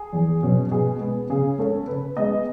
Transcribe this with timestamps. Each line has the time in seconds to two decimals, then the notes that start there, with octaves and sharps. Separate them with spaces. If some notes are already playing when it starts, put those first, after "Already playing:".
Already playing: G#4
0.13 E2
0.42 B2 F#3 C#4
0.71 B2 G#4
1.00 G#3 B3 G#4
1.30 C#3 G#4
1.58 G#3 C#4 A4
1.87 C#3 B4
2.17 G#3 B3 D#5